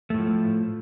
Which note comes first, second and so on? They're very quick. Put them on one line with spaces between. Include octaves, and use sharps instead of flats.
A3 A2 F3